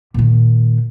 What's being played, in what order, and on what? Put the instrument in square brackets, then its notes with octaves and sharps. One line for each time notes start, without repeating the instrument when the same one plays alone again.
[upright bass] A#2 D#3